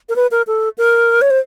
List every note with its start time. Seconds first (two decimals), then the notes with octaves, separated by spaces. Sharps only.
0.09 A#4
0.16 B4
0.31 A#4
0.47 A4
0.78 A#4
1.21 C#5
1.30 C5